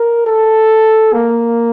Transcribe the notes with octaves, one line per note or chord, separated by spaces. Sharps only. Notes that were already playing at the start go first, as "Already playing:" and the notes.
Already playing: A#4
A4
A#3